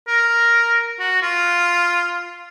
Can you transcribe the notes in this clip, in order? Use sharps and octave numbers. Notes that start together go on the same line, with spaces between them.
A#4
F#4
F4